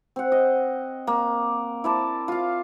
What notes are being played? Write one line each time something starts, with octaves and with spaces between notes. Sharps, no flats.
C4 F#5
D#5
A#3
E4 D5 A5
F4 F5